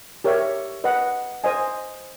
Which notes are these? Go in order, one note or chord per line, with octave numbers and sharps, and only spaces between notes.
G4 A#4 C#5 E5
B4 D#5 F#5
C5 D#5 G#5